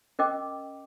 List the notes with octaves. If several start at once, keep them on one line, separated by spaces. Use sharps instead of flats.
C#4 A#4 D#5 G5 D6